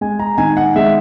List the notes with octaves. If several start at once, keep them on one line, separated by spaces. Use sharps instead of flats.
G#3 G#5
A#5
D#3 G#5
F#5
G#3 E5